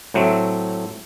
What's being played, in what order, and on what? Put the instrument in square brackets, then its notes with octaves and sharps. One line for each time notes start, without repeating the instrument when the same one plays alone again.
[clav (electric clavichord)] A2 F#3 A3 C4